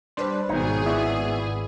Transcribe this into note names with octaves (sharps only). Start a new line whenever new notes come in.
G3 D4 B4 C5 C6
G#1 B2 D#3 D#4 G#4 C#5
B3 E4 D5 E5 C#6